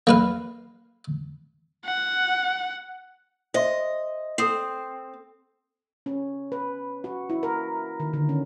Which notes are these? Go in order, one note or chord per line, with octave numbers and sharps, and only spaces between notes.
A#3 B4 F5
F#5
C5 D#5 E5 C6
C4 A4 D#6 C7
C#4
B4
F#4
E4
A#4
D#3
D3
C#4